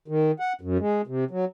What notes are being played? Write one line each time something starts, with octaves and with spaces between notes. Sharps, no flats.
D#3
F#5
F#2
G#3
C3
F#3